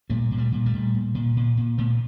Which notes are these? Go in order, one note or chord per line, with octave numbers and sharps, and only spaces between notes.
A#2 G3 A3
A#2
G3 A3
A#2
G3 A3
A#2
A#2
A#2
A#2
A#2
A#2 A3 B3